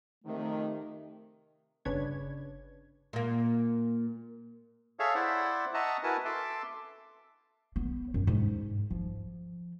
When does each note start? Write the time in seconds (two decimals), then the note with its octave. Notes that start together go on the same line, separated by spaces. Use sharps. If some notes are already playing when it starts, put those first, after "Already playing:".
0.24 F2 C3 D#3 A3
1.85 G1 C#3 D4 B4 C#5 G#6
3.13 A#2 A#3
4.99 G#4 A4 C#5 E5 F5
5.15 E4 C5 D5 E5 F#5
5.74 D#5 E5 F#5 A5 A#5 C#6
6.03 E4 F#4 A#4 B4 G#5 A5
6.25 A4 E5 A5 C6 D6
7.76 B3
8.14 F#2
8.27 G#2
8.91 F3